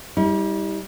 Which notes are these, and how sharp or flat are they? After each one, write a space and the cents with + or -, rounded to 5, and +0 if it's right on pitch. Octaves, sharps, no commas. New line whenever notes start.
G3 +5 E4 -45